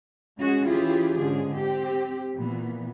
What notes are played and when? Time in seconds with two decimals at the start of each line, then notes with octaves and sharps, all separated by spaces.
0.38 G#3 C#4 F#4 G#4
0.67 E3 C#4 E4 F4 G4 G#4
1.17 G#2 D3 C#4 G#4
1.54 C4 G4
2.36 A#2 E3 B3